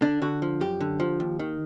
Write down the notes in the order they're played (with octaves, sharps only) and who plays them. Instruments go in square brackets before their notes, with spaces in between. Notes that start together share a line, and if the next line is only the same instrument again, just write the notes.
[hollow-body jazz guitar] D3 D4
D3 F#4
F3
F#2 G4
D3
F3
D#2
D#3